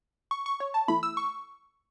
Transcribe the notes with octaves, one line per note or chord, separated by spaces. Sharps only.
C#6
C#6
C#5
A5
E2 E3 A3 E4 B5
E6
C#6